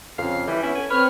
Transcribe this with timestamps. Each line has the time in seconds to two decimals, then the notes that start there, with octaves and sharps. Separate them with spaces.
0.18 F2 C#3 F5
0.48 E3 G3 G4
0.63 B3 C#4 E4
0.75 A4 G#5
0.90 C4 B4 C#5 F6